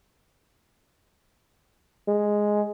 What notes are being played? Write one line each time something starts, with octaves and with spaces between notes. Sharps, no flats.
G#3